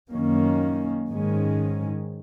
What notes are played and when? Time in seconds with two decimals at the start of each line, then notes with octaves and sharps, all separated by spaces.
0.10 F#2 D#3 A#3 C#4
1.07 G#2 D#3 G#3 C#4